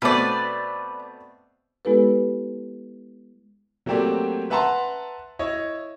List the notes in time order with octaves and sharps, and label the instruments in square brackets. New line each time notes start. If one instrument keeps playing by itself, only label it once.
[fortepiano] B2 A3 C4 [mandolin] B4 D5
[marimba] G#3 B3 E4 G4 A4 B4
[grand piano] F#3 A3 A#3 C4 G4 D5
B4 E5 F#5 A5 A#5 C6
E4 C#5 D#5